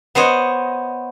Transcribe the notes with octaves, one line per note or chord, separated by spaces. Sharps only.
B3 C5 C#5 D#5